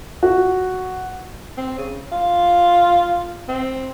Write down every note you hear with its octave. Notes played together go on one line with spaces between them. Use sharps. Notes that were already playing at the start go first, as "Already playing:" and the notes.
F#4
C4
C#3
F4
C4